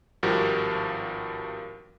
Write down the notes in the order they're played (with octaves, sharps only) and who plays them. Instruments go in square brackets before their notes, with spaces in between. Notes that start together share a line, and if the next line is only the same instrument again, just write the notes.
[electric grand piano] G#1 G2 F3 F#4 G4 A#4